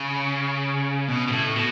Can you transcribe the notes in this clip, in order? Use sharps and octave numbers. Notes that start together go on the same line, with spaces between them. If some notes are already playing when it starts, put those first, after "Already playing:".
Already playing: C#3
B2
B2
A2
B2